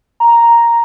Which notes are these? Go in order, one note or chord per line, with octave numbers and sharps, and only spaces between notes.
A#5